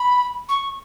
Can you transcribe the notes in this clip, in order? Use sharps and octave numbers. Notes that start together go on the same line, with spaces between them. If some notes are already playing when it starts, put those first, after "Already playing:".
Already playing: B5
C#6